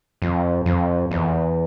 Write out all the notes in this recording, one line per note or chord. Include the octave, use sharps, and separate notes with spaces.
F2
F2
E2